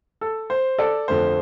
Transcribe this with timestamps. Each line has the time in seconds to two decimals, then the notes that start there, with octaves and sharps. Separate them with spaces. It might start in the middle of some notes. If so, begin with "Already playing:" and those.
0.21 A4
0.50 C5
0.78 A4 D5
1.08 F2 D3 A3 C5